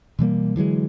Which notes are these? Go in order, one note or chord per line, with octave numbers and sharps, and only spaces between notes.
B2 E3 G3 A#3
D3 E3 F#3 G#3